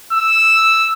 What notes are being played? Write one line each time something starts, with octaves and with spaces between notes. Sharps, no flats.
E6